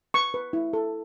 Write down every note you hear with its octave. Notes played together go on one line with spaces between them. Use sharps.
B4 C#6
B4
E4
A4